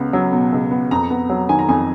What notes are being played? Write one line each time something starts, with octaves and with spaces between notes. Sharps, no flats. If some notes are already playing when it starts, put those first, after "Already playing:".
Already playing: C#2 B3
F#3
B2
C#2
B3
F2 A#5
B3
F#3
D#3 G#5
A#5
F2 G#5